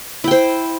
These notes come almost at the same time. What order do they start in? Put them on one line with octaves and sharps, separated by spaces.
E4 G5 C5